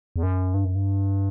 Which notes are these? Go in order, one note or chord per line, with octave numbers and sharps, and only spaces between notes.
E2
F#2
G2
F#2
G2